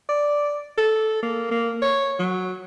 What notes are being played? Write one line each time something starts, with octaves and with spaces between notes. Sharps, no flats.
D5
A4
A#3
A#3
C#5
F#3